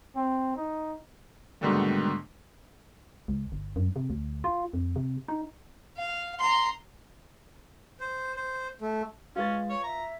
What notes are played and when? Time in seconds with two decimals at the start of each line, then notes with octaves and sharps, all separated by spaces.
0.15 C4
0.56 D#4
1.61 G#2 B2 D3 D#3 G3 A3
3.28 C#2
3.52 G1
3.76 F#2
3.96 C3
4.10 D2
4.44 F4
4.74 F2
4.96 C3
5.28 D#4
5.97 F5
6.40 A#5 C6
8.00 C5
8.36 C5
8.81 A3
9.36 G#3 C#4 F4 B4 A6
9.69 C#5
9.83 E5 A#5